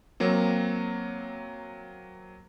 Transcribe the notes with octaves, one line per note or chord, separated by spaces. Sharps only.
F#3 A#3 C4